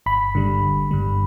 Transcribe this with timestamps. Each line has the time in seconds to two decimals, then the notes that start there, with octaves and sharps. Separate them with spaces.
0.06 G1 B5
0.35 G2 D3 G3
0.62 G1
0.91 G2 D3 G3